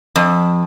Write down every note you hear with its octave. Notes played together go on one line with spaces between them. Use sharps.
F2